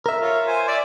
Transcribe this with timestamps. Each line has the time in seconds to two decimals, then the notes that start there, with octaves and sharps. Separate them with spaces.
0.06 A#4 E5
0.21 F4 C#5
0.47 C5 G#5
0.68 D5 E5